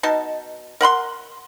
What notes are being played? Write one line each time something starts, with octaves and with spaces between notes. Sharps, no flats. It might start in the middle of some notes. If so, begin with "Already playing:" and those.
B2 D#4 A5
A#4 F#5 B5 C6